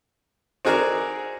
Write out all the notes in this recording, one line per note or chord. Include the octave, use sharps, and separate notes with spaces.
C4 D#4 F#4 G#4 A#4 D5